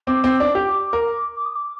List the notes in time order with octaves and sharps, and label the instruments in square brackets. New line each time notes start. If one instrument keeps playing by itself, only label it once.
[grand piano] C4 [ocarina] D6
[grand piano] C4
D4
G4
A#4
[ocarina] D6
D#6
D6